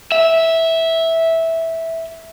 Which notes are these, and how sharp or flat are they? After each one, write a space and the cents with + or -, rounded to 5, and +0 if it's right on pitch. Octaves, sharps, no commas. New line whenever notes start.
E5 -10